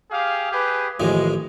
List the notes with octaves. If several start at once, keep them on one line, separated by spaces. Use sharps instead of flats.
G4 G#4 F5
G4 G#4 B4
A1 D#3 F3 G#3